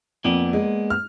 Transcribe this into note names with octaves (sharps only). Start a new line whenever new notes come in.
F2 A#3 B3 D5
G#3
F6